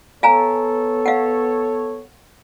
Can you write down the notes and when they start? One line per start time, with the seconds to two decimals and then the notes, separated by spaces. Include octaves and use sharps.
0.23 B3 A4 C#5 F5 G#5 A#5
1.06 F5 F#5